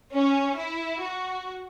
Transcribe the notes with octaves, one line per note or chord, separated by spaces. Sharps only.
C#4
E4
F#4